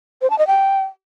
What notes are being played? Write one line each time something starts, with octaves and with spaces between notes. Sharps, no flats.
C5
A5
D#5
G5